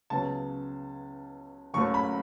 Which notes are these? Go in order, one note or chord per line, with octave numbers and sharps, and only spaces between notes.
C#2 C#3 F#3 B3 A5
F#1 F#2 C#3 F#3 A3 C#6
B5